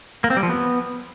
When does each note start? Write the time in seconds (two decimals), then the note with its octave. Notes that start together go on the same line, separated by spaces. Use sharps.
0.24 A#3
0.30 C4
0.37 G3
0.43 F3
0.49 B3